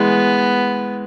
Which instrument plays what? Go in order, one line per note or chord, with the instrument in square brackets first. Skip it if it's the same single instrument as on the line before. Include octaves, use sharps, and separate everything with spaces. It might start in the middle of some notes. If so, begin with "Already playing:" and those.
Already playing: [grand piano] E3 G#3 [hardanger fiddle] B3